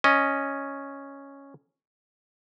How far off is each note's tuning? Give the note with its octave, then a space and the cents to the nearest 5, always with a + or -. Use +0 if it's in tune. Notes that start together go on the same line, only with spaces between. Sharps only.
C#4 +0 D#5 +0